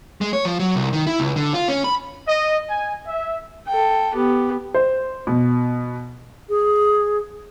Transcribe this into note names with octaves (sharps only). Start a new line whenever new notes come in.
G#3
C#5
F3
F#3
C2
D#3
E4
C#2
D3
F4
C#4
B5
D#5
G#5
E5
A4 G5
B3 G4
C5
B2
G#4